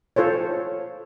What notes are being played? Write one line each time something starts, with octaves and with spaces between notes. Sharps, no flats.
F4 A4 C5 C#5